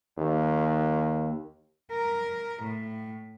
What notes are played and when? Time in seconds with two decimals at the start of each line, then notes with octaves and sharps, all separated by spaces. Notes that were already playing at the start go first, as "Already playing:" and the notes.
0.18 D#2
1.91 A#4
2.62 A2